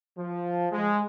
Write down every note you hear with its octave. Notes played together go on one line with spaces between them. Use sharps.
F3
G#3